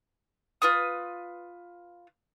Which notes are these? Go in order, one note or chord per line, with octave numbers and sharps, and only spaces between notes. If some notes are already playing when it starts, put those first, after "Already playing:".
F4 B4 D#6